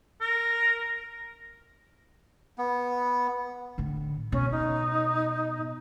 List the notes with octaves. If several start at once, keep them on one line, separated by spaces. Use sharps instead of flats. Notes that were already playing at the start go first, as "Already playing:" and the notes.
A#4
B3
A2 D3
B2 C#4
D#4